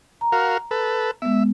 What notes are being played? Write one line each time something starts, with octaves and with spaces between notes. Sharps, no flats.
A#5
F#4 A#4 F5
A4 B4
G#3 B3 E5